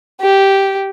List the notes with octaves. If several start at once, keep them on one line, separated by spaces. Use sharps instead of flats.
G4